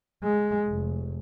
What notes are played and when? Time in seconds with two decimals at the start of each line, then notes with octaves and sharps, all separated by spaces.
0.23 G#3
0.68 F1